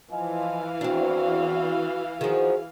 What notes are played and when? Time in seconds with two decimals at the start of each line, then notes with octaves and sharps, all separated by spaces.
0.12 E3 F3 D#5 F5 G#5
0.81 E2 C4 D4 F#4
2.21 D#3 F3 F#4 G#4